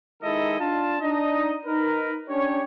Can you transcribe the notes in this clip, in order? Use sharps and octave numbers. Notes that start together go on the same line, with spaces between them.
D#3 G#3 D#4 E4 A4 D#5
D4 F4 A5
D4 D#4 D#5
D#4 A#4 B4
C#4 D4 G4 C#5